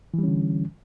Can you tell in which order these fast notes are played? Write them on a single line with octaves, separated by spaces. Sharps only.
E3 G3 C#4 D3